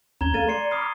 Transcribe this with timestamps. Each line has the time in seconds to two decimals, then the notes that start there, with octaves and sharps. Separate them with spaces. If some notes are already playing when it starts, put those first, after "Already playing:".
0.21 D#2 C#4 A#5 G#6 G7
0.34 A3 A4 F5 A6 D#7
0.48 D5 C6 C7 C#7
0.71 B5 D6 D#6 F6 C7